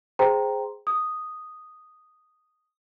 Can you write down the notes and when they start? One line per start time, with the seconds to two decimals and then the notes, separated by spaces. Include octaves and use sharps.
0.19 G#4 C5 G5 A#5 C6
0.87 D#6